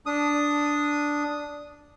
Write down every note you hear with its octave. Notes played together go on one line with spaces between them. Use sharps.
D4 D#6